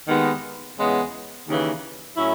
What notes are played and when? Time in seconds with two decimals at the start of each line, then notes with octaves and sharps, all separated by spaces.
0.06 D#2 D#3 G#3 B3
0.77 E2 C#3 G#3 B3
1.46 D#2 C#3 E3
2.16 A2 F#3 C#4 E4